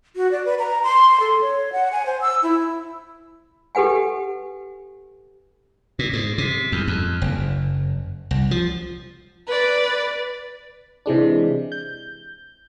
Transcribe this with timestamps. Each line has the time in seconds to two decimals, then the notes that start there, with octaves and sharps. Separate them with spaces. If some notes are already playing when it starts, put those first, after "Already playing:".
0.16 F#4
0.31 D5
0.45 B4
0.59 A#5
0.84 C6
1.20 A4
1.41 C#5
1.72 F#5
1.92 G#5
2.06 C5
2.21 E6
2.43 E4
3.75 G4 A4 B4 F#5 G#5
5.99 A#2
6.13 G#2
6.38 C3
6.72 E2
6.88 F2
7.21 F#1
8.31 C2
8.51 F3
9.46 B4 D5
11.06 C3 E3 G#3 D4
11.72 G6